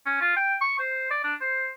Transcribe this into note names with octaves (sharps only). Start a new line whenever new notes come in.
C#4
F4
G5
C#6
C5
D5
D4
C5